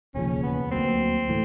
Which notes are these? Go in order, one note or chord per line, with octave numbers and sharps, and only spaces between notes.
E1 D#2 C#3 F3 C#4
B3
D2 D3 F#3 A#3 C4
A2 E3 A3